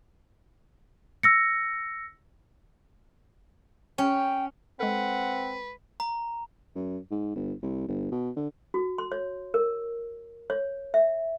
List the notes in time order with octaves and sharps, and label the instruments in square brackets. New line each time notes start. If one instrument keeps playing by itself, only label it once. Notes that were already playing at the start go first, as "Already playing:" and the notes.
[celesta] E6 A#6 C#7
[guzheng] C#4 [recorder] G5
[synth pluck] G#3 A4 [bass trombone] C4 [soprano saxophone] B4 [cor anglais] F#5
[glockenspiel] A#5
[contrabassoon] F#2
G#2
G1
C2
G1
B2
D3
[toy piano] F#4
C6
C#5
A#4
C#5
E5